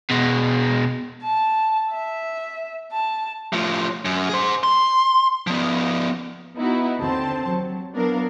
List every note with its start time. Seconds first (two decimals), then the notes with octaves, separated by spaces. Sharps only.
0.11 B2 G#3
1.23 A5
1.92 E5
2.92 A5
3.53 A2 F3
4.05 F#2
4.29 G#4 C5
4.64 C6
5.47 F3 B3
6.56 B3 D#4 E4 F#4
6.99 D#2 D3 C4 C5 A5
7.47 F#3
7.93 F#3 B3 D4 E4 A#4 F5